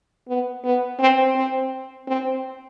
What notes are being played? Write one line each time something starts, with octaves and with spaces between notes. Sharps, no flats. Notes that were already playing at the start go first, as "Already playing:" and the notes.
B3
B3
C4
C4
C4